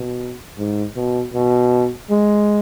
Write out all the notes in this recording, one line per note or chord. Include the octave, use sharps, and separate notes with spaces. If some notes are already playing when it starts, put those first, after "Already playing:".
Already playing: B2
G#2
B2
B2
G#3